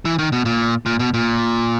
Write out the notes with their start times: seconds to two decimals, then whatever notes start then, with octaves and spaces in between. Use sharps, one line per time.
0.05 E3
0.19 D#3
0.32 B2
0.45 A#2
0.86 A#2
0.99 B2
1.14 A#2